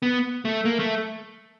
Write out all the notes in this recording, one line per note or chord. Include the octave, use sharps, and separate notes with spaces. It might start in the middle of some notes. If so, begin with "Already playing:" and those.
B3
A3
A#3
A3